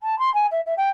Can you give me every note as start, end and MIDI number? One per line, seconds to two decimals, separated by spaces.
0.01 0.18 81
0.18 0.32 84
0.34 0.46 80
0.51 0.60 76
0.66 0.73 76
0.77 0.89 79